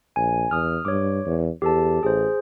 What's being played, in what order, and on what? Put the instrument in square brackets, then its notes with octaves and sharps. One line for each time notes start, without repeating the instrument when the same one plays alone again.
[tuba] A#1 [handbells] G#5
[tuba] E2 [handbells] D#6 F6
[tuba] G2 [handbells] C#5 D6
[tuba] E2
[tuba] E2 [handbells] G4 A4 A5
[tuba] A1 [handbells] G#4 C5